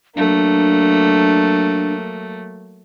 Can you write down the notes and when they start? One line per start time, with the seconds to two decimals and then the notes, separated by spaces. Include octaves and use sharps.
0.16 F#3 A3 A#3 D4